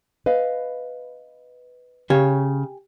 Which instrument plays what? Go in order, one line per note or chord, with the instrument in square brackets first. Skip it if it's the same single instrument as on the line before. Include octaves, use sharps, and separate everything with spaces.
[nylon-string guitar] B4 D#5 F5
[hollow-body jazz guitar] C#3 C#5 [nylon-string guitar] G4 G#5